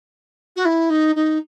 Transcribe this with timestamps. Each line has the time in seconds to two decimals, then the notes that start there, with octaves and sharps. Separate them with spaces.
0.56 F#4
0.65 E4
0.90 D#4
1.15 D#4